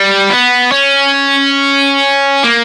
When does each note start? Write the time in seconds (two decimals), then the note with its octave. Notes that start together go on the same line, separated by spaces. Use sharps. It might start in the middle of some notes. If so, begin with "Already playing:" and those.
Already playing: G3
0.30 B3
0.72 C#4
2.43 A#3